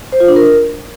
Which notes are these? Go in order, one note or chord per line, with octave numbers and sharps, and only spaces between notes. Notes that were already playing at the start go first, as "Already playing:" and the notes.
C5
F4
D4
A#4